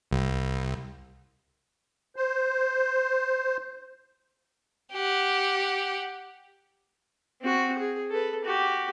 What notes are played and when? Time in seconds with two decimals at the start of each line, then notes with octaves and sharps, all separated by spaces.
0.11 C2
2.16 C5
4.92 G4 F#5
7.41 C4 F#4
7.78 G#4
8.11 A4 B4
8.45 F#4 G4